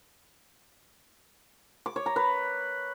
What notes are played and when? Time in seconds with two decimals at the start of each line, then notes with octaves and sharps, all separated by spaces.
1.86 D6
1.96 C#5
2.06 A#5
2.16 B4